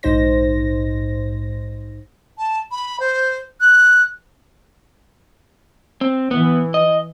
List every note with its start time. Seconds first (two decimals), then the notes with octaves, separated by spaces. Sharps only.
0.03 A#1 G#2 D#4 C5 A#6
2.38 A5
2.71 B5
3.00 C5
3.61 F#6
6.01 C4
6.31 E3 B3
6.74 D#5